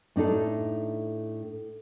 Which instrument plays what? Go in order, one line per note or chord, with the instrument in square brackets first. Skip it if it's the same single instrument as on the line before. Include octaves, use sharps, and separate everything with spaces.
[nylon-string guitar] A2 D4 D#4 A4